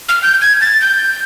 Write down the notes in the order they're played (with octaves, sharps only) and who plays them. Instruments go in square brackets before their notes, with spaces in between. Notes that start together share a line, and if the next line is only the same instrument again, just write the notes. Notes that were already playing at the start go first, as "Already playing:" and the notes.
[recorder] F6
G6
G#6
A6
G6